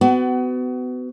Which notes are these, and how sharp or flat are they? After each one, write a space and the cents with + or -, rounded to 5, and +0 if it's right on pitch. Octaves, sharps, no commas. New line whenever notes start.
B3 +30 F#4 +25